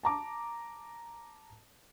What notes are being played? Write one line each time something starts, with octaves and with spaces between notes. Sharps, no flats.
A5 A#5 D6